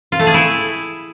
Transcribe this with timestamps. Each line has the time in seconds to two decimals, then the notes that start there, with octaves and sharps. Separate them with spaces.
0.12 F4
0.19 A3
0.27 G#4
0.34 E4